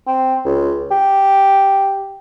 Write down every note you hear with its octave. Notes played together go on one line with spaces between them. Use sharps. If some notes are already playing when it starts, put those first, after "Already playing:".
C4
C#2
G4